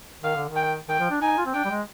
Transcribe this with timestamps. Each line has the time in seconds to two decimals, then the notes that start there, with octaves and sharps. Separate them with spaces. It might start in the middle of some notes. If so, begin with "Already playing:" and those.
0.23 D#3 F5
0.36 D3
0.49 D#3
0.56 G5
0.88 D#3 G5
1.00 F3
1.11 D4
1.21 D#4 G#5
1.38 F4
1.46 C4
1.54 D4 G5
1.65 G3
1.70 G#3